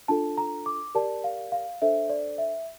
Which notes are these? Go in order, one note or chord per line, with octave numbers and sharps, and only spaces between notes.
D4 F4 A4 A5
A#5
D6
G4 A#4 D5 A5
F5
F5
D4 A4 C5 E5
D5
E5